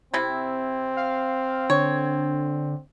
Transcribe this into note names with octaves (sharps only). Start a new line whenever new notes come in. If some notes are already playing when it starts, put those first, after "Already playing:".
C3 C4 E4
F5
D3 C#5